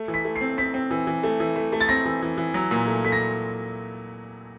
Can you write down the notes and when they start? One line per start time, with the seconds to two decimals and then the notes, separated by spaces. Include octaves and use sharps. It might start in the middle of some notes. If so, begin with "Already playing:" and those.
Already playing: A3
0.08 E3
0.14 B6
0.25 A3
0.36 C7
0.41 C4
0.58 C4 B6
0.74 C4
0.91 E3
1.07 E3
1.23 A3
1.40 E3
1.56 A3
1.72 A3
1.81 A6
1.89 C4 A#6
2.05 E3
2.22 E3
2.38 E3
2.54 F#3
2.71 A#2
2.87 A3
3.04 A3 B6
3.12 A#6